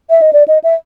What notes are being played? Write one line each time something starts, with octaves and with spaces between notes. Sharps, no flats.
E5
D#5
D5
D#5
E5